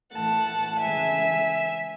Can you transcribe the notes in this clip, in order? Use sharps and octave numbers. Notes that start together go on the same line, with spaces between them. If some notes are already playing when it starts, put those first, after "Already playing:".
A2 E3 A3 F#5 A5
C#3 E3 G#3 E5 G#5